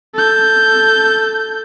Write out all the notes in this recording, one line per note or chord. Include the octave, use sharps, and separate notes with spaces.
A4 G6